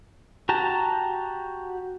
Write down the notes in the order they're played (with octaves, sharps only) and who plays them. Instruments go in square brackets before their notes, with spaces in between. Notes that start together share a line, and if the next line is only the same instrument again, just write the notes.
[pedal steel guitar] F#4 G4 A5 A#5